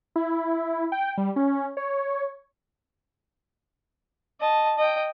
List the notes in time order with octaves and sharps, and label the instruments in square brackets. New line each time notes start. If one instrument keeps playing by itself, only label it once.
[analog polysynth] E4
G5
G3
C#4
C#5
[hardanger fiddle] D#5 A5
D#5 G5